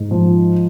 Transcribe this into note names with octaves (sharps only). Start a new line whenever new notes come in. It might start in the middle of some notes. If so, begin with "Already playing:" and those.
Already playing: G#2
F3